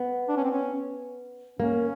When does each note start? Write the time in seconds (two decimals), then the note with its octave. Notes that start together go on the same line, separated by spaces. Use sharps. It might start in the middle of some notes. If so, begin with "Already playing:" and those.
Already playing: B3
0.29 D4
0.37 C#4
0.44 C4
0.51 C#4
1.59 A#3 C#4